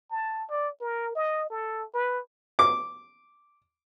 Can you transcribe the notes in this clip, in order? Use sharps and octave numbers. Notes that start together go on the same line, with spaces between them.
A5
D5
A#4
D#5
A4
B4
D6